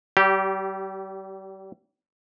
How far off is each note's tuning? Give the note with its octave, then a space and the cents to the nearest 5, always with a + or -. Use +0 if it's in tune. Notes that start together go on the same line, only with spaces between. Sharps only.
G3 -40 G4 -10